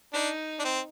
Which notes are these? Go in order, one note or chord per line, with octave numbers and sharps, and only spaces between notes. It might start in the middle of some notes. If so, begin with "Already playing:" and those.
D4 D#4
D4
C4